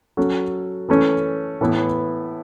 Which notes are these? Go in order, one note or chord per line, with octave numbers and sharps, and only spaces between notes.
F#3 C#4 F#4 A4
E3 A3 C#4
A2 E3 B3 E4